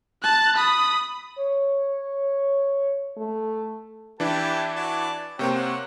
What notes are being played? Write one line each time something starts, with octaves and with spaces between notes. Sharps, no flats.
A5 F#6
B5 D#6
C#5
A3
E3 D4 E4 G4 B4 A5
F#4 D5 A5
C3 A#3 C4 C#5 G5
C#5 F#5